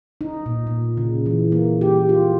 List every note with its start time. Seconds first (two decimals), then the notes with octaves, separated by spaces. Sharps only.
0.21 D#4
0.46 A#2
0.67 A#2
0.97 C#3
1.26 E3
1.52 A#3
1.81 G4
2.09 F4